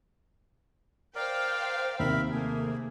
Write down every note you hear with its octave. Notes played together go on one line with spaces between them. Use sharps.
A#4 C5 D5 F5 G5
D#2 C3 A#4 E5 B5
A3 A#3 G#4